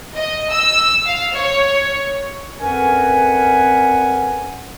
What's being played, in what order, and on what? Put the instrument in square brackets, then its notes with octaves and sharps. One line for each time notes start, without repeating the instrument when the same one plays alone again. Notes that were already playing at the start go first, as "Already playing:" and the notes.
[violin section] D#5
E6
F5
C#5
[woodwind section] F2 C#4 A#4 B4 F#5 G#5